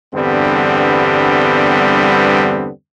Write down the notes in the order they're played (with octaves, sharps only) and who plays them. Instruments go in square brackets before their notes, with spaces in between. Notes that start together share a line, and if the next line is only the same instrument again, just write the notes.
[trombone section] E2 G2 D3 G3 B3 C4